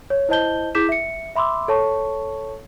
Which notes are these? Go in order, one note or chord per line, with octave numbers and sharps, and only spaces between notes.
C#5
E4 C5 D#5 A5 G6 G7
E4 G#4 D6 G6 B6 E7
E5 C#7
E5 B5 C6 D6 E6
A4 C#5 A5 C#6